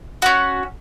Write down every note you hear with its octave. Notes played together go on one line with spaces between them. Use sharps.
C#4 F#4